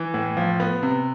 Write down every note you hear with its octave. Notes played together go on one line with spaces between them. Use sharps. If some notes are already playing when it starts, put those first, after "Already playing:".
Already playing: E3
A2
F3
B3
C3